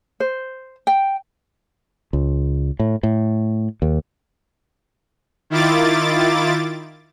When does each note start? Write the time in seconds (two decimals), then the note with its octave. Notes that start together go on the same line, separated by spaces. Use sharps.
0.20 C5
0.87 G5
2.13 C#2
2.79 A2
3.03 A2
3.82 D#2
5.50 D#3 E4 F4 D6 A6